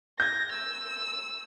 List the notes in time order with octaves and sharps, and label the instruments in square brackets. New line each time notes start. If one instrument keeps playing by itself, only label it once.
[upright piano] G6 G#6 [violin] A#6
[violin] E6